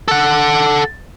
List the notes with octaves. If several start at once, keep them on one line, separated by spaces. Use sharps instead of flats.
A4 F#5